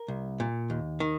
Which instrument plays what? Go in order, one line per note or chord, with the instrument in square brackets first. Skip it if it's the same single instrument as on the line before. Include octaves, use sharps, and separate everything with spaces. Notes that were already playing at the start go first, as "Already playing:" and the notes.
Already playing: [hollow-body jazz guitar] A#4
C2
A#2
D#2
D#3